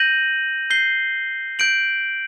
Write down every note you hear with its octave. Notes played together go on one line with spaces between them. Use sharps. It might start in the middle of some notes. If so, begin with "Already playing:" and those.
Already playing: G6 A#6 D#7 F#7
G6 C7 G7
G6 D7 F#7